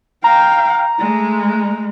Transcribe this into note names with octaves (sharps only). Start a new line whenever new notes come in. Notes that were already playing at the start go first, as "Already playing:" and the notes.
F5 G5 A#5
G#3 A3